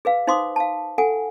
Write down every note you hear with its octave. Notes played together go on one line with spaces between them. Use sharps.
G#4 B4 F5
D#4 C5 F5 C6 D6 D#6
F5 A5
A4 F#5 G#5